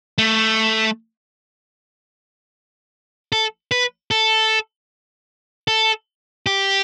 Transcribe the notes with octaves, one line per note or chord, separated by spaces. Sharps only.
A3
A4
B4
A4
A4
G4